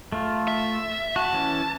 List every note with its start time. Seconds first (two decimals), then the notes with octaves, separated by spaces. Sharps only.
0.12 A3 F4
0.48 E5
1.16 F#4 A5
1.33 E3 C#4